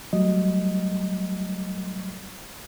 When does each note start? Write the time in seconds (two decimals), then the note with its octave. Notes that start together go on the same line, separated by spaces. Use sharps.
0.13 F#3 G3 A3 D#5